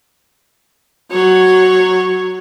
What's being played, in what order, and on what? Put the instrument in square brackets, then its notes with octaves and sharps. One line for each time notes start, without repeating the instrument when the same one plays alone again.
[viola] F#3 C#5